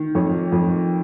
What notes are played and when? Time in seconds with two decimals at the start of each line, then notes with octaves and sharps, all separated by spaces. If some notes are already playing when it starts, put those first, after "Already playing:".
Already playing: D#3
0.15 F2 C#5
0.52 F2